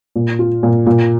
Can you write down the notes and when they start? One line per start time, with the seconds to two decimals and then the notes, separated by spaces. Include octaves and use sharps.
0.16 A#2
0.39 F4
0.63 A#2
0.87 A#2